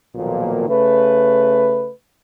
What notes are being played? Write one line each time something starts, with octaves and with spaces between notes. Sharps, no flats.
B1 A#2 D#3 F3 A#3
C#3 A3 B4